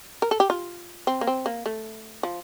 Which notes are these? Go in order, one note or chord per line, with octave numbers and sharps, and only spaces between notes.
A#4
A4
G4
F4
C4
A#3
C4
A#3
A3
F3